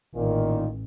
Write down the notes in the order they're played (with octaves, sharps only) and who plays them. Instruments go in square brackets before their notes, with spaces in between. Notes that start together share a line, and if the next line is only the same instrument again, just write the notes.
[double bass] A1 [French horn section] A#2 D#3